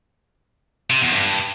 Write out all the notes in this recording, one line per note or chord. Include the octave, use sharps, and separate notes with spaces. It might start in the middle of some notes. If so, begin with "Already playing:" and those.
C3
E2
G2